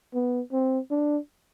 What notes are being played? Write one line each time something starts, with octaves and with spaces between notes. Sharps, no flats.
B3
C4
D4